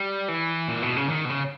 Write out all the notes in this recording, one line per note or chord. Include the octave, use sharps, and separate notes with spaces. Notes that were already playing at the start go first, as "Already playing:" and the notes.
Already playing: G3
E3
A#2
B2
C#3
D#3
B2
C#3